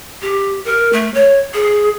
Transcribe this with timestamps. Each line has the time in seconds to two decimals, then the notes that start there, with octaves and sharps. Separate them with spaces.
0.22 G4
0.65 A#4
0.93 A3
1.14 C#5
1.54 G#4